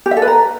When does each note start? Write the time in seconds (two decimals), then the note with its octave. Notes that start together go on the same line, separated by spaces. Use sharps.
0.06 G4
0.11 E5
0.17 A4
0.22 B4
0.28 A#5